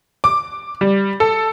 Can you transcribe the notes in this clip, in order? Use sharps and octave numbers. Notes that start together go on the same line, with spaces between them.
D6
G3
A4